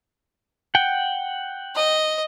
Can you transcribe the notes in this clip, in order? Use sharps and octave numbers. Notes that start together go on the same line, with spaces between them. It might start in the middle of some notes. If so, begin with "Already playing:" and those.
F#5 G5
D#5